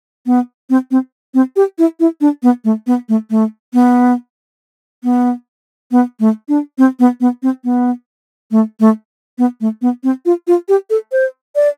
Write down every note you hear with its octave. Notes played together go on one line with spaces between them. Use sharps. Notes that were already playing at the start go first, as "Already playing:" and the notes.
B3
C4
C4
C4
G4
E4
E4
D4
B3
A3
B3
A3
A3
B3
B3
B3
A3
D4
C4
B3
B3
C4
B3
A3
A3
B3
A3
B3
C4
F4
F4
G4
A4
C5
D5